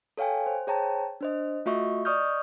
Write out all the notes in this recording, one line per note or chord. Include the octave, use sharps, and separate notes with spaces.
A4 C#5 F5 G5 G#5
C5
G#4 C5 C#5 G5 A5 A#5
D4 C5 D#5
A3 F4 F#4 D#5 E5 C#6
D5 D#5 C#6 D#6 F6 G6